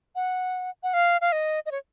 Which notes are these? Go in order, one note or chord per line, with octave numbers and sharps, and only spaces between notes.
F#5
F#5
F5
F5
D#5
D#5
C#5